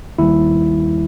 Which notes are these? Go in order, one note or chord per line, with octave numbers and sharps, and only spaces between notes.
D#2 D#3 G3 E4